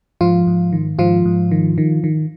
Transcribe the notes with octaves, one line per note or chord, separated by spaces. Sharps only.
G#2 F3 F4
G#2
D#3
G#2 F3 F4
G#2
D#3
D#3
D#3